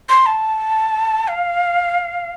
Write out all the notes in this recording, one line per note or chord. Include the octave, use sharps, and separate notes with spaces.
C6
A5
F5